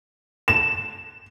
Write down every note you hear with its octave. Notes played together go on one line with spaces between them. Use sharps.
E7